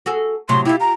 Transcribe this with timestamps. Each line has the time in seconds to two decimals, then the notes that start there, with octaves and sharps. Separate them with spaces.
0.06 F#4 G#4 A4
0.49 A2 C3 F#3 C6
0.65 E4 F4 G4
0.80 A#5